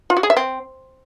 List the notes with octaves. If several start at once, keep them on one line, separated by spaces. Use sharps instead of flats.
F4
F#4
G#4
E5
C4